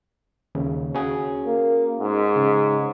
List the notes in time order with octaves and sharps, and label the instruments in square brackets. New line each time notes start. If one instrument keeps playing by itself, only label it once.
[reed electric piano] D#2 C#3
C#4 F#4 G#4
[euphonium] A#3
G#2
[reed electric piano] C#3